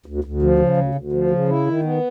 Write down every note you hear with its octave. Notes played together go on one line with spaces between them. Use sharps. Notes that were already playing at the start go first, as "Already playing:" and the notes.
D2
D2
F3
C#3
D2
D2
F3
C#3
E4
D#3
B3